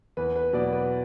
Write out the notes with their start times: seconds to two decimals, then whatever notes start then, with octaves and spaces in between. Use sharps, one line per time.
0.17 E2 B4
0.36 B4
0.53 B2 F#3 D5
0.73 B4